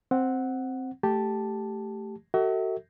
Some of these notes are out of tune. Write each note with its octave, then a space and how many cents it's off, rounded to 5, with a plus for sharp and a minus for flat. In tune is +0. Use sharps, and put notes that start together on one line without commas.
C4 +0 F#5 +0
A3 +0 G4 +0 A5 +0
F#4 +30 A4 +35 E5 -30